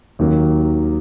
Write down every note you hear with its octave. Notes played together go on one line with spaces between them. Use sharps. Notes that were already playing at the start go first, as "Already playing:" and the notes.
D#2 D#3 F#3 A#3